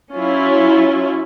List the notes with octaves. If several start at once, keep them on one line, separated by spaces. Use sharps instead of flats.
F#3 C#4 E4 F4